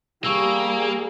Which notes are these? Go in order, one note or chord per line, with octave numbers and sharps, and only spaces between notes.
G3 A#3 G4 G#4 C#6 E6